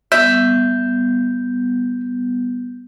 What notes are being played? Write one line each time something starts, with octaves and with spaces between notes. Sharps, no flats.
G3 B3 E5 G6